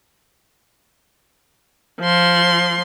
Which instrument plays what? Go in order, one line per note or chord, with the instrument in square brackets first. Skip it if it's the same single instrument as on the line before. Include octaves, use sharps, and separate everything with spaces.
[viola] F3 C6